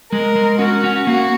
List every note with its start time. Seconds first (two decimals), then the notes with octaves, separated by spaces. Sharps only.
0.12 G#3 A#4
0.36 G#3
0.59 C#4 F#4
0.84 C#4
1.07 A#3 F#4